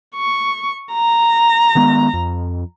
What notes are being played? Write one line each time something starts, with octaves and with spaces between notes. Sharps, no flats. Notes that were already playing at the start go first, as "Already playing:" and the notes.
C#6
A#5
D#3 G#3 B3
F2